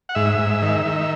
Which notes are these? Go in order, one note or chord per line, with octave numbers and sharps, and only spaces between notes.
F#5
G#2 E5
G#2
D#3
D#3